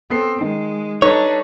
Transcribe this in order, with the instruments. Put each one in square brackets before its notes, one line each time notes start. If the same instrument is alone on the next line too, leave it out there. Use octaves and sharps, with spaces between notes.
[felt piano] B3 A4 C7 [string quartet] C4
[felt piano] D#3 [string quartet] G#3
[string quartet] G3 D4 [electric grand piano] D#4 A4 B4 [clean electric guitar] C#5